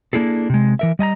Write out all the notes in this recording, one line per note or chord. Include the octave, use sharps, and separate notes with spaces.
A#3 D4 E4 G#4 A4
C3 G#3
E3 A#4 E5
G3 D#5 A5 A#5